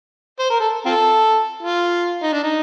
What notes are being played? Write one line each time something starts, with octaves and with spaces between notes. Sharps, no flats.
C5
A#4
A4
C4 F4 A4
F4
D#4
D4
D#4